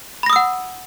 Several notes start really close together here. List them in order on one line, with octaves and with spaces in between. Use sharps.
B5 A#6 D#6 E6 F#5